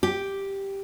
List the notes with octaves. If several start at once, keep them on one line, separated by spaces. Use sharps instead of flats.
G4